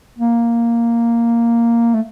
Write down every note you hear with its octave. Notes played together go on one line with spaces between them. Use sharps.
A#3
A3